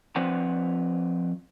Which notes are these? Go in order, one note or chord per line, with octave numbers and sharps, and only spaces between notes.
F3 C4 B4 D5 F#5 A#5